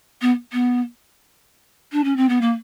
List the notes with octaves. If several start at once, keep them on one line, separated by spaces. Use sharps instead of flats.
B3
B3
D4
C#4
C4
B3
A#3